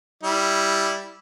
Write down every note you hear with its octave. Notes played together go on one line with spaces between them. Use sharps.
G3 E4